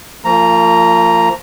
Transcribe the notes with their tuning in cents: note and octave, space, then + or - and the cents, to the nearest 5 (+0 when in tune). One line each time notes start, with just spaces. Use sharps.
F3 -10 A#3 -40 A#5 +0